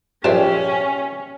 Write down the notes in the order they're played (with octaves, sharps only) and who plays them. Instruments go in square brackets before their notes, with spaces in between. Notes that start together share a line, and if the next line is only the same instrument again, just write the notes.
[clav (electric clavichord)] A#1 A5 [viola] C#4 [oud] G4 E5 [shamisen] B4 C5 D5